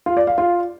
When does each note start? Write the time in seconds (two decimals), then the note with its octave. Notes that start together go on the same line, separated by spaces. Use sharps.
0.06 F4
0.17 D5
0.27 F5
0.38 F4